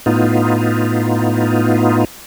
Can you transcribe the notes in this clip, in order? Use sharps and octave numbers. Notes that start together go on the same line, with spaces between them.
A2 B3 D#4 F4